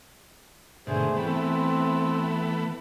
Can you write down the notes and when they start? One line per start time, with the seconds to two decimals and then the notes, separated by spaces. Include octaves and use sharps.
0.87 G#2 B2 D3 A3 G#4 C5
1.17 E3 A3 B3 C4